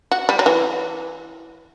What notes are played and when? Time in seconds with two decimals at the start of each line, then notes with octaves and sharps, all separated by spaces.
0.11 F#4
0.29 G3
0.39 F#3
0.46 E3